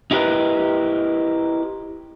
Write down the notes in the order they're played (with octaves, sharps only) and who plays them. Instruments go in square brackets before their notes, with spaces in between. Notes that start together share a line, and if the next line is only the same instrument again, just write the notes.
[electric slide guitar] D#4 E4 G4 A#4 B4 D#5